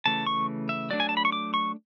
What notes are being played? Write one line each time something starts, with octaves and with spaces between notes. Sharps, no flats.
C#3 E3 A3 A5
C#6
E5
F#3 A3 D4 D5
G#5
A5
B5
C#6
D6
C#6